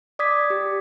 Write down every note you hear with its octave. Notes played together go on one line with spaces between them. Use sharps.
D5 D6 D#6 G#6 B6
G4